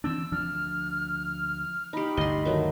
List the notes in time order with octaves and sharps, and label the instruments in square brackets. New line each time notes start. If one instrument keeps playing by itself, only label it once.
[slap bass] E3 C4 D4 [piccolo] E6
[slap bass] D2 F3 D4 [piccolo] F6
[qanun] D#4 G4 [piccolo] B5
[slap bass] G1 D2 [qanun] D#5 C6
[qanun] D#3 F#3 A3